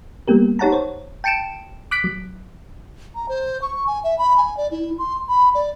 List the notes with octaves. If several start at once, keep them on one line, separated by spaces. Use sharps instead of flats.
G3 A#3 B3 G4 A#4
D#4 G4 C#5 F#5 A5 A#5
C5 C#5
G5 A5 C#7 D7 E7
D6 F#6 B6 D7
F#3
A#5
C5
C#6
G#5
E5
B5
G#5
D5
E4
C6
B5
D5